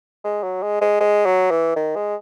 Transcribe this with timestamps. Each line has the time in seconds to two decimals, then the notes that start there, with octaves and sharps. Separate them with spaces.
0.24 G#3
0.43 F#3
0.63 G#3
0.81 G#3
1.00 G#3
1.26 F#3
1.51 E3
1.76 D#3
1.96 G#3